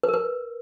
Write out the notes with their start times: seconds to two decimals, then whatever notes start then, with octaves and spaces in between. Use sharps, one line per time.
0.03 B4
0.09 A#4
0.14 B4